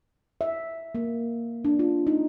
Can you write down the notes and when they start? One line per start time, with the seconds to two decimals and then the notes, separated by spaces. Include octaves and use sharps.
0.41 E5
0.95 A#3
1.65 D4
1.79 F4
2.07 D#4